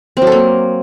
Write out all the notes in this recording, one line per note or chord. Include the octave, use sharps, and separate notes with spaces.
C4
F#3
A4
A#3